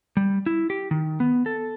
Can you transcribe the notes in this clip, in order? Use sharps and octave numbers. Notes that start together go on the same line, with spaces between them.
G3
E4
G4
D#3
B3
A4